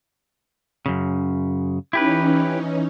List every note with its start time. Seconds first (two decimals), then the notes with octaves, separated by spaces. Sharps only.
0.86 F#2 C#3
1.93 E3 C#4 D#4 E4 G4 B4